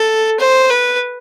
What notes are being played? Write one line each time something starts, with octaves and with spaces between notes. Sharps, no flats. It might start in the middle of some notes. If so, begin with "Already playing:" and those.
Already playing: A4
C5
B4